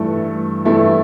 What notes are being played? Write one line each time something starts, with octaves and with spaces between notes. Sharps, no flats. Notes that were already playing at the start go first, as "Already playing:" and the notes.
Already playing: G2 E3 A3 E4 A4
G2 E3 A3 E4 A4